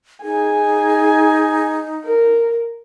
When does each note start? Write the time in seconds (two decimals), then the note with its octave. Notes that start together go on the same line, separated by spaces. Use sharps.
0.24 D#4 G#4 G#5
2.05 A#4